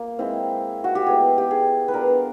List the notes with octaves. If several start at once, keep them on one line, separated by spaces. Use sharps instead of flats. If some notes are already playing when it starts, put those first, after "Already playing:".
Already playing: A#3 F4
G#3 C4 E4
F#4
G4
G#3 B3 E4 G#4
G4
G#4
B4
G3 B3 D4 F4 A#4